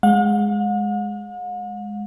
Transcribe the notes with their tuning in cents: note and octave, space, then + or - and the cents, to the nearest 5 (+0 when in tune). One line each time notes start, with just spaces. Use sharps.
G#3 +0 F#5 -45